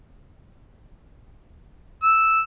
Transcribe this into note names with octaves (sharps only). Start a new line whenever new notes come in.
E6